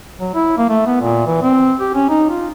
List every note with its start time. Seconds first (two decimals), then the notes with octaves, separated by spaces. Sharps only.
0.20 F#3
0.35 E4
0.58 A#3
0.69 A3
0.87 B3
1.01 A#2
1.27 E3
1.43 C4
1.80 G4
1.94 C#4
2.09 D#4
2.29 F4